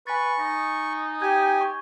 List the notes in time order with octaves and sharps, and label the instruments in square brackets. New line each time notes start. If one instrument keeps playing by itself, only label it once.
[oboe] B4 [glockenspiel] G#5 A6 [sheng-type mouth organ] C#6
[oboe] D#4 [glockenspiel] A#6
[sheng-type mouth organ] G4 G#5 [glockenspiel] G6 G#6
[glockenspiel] C#6